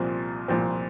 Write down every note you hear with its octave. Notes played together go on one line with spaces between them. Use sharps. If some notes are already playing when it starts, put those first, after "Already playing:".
Already playing: C2 A#2 F3 C4
C2 A#2 F3 C4